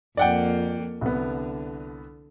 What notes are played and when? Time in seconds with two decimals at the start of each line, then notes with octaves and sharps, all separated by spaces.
0.17 F2 A#3 D5 F#5 G5
1.01 C2 D3 B3